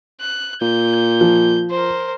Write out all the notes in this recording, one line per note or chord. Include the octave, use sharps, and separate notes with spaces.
F#6
A#2 G6
F3
A#4 C5